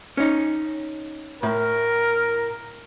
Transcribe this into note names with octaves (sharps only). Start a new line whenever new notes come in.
C#4 D#4
A2 A#4